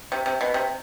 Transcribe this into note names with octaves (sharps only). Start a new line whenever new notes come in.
C3
C3
B2
C3